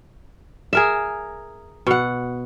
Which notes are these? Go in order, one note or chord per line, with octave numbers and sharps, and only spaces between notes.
G#4 A#4 E5
B2 F#5